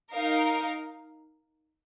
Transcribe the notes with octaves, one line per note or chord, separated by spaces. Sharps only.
D#4 A#4 F5